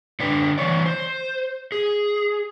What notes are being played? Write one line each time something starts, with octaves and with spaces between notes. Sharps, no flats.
D3 D4 B4
E3 G#3 C#5 D5
C5
G#4